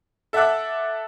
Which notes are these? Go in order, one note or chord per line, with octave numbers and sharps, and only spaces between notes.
A4 E5 F#5 D6 F#6